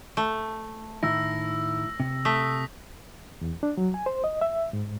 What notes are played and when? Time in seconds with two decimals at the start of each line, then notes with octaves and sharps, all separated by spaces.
0.17 A3
1.03 A2 D#3 E4 E6 A#6
2.00 C3
2.25 A3 D#6 B6
3.41 E2
3.63 D4
3.77 F#3
3.94 G#5
4.06 C5
4.24 D#5
4.41 E5
4.73 G#2